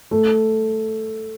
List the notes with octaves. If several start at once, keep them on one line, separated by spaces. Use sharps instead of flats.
A3